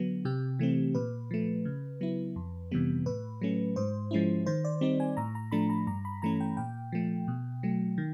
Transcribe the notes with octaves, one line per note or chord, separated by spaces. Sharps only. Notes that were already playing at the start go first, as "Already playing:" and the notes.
Already playing: D3 F#3 B3
C3 G4
E3 A3 C4
A#2 B4
F3 A3
C#3
F#3 B3 E4
F2
C3 E3 G3 B3
A2 B4
F#3 A3 C#4
G#2 C5
F3 G#3 C#4 E4
D#3 C5
D5
G3 C4 D#4
G#5
A2 A#5
A#5
F3 A3 D4 B5
A#5
G2 A#5
B5
E3 A3 C#4 A#5
G5
A#2 G5
F3 A3
B2
F#3 A3
D#3